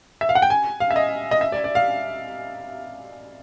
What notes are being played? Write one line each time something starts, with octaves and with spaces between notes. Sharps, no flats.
E5
F5
F#5
G5
G#5
F5
E5
D#5
D#5
E5
D5
D5
F5